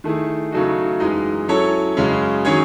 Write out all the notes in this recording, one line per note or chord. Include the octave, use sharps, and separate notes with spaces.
D#3 A3 E4 G#4
C#3 F#3 A3 D#4 F#4
F#2 E3 G#3 D#4
F#3 C#4 E4 A4 C#5
F#2 C#3 G#3 C#4
D#3 F#3 C#4 G#4 C#5